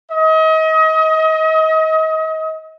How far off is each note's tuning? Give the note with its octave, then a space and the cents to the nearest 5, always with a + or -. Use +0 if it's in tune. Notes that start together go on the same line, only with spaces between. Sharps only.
D#5 +35